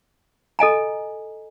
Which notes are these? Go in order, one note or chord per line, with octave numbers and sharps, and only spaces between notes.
A4 D#5 G#5 A#5